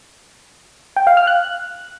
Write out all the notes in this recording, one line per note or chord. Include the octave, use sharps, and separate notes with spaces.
G5
F5
F6
F#6